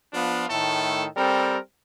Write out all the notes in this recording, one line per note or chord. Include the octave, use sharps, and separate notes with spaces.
F3 B3 D4 F4
A2 D#3 A3 A4
G3 C4 A4 A#4